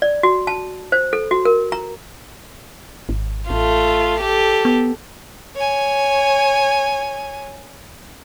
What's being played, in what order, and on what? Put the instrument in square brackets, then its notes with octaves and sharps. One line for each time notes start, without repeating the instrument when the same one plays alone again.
[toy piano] D5
F#4
A5
C5
A4
F#4
A#4
A#5
[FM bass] G#1
[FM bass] A1 [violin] A3 F4
[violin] G4 A4
[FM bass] B3
[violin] C#5 G#5